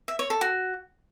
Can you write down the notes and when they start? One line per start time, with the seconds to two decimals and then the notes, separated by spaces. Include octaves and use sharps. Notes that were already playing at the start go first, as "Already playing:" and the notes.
0.08 E5
0.19 C#5
0.30 A4
0.41 F#4